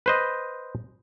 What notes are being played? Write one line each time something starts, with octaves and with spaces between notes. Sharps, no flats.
B4 C5 D#5